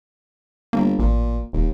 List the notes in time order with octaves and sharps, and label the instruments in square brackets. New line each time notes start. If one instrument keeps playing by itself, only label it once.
[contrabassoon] G1 [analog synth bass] A#3
[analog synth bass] A1 [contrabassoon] A#2
[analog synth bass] E1 [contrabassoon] D#2